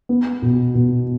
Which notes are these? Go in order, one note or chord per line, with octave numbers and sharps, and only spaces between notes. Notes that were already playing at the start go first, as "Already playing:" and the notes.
B3
B2
B2